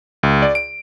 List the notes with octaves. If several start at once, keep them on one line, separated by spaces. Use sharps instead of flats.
C#2
D5
D7